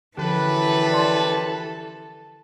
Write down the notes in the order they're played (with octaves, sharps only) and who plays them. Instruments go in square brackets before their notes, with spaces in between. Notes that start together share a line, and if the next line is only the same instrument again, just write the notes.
[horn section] F#2 G4 B4 [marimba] D3 F3 [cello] E3 [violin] A4
[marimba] D5 C6